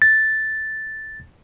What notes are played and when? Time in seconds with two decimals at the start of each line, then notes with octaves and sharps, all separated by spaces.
0.02 A6